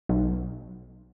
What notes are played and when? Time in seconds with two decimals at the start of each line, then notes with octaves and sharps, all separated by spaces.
0.09 B1